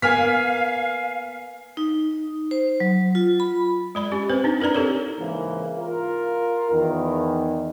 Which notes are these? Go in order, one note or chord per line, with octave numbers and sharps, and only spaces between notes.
A#3 B3 F5 G#5 F6 B6
D#4
C5
F#3
F4
B5
G#3 D5 B5
C#4 G4
C4 B4 C5
D4 D#4
E4 A#4 B4 D5 A#5
C4 G4 A4 A#4 C#5
G#2 C#3 E3 A#3
F4 A#4
E2 D#3